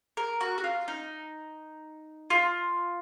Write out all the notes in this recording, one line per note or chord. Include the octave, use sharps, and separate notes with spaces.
A#4
F#4
F#4
F4
D#4
F4